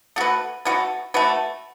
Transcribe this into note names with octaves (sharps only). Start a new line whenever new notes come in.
A3 F#4 B4
A3 F#4 B4
A3 F#4 B4